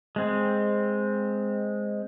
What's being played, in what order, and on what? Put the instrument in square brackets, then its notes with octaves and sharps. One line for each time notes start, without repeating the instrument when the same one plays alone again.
[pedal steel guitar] G#3 C4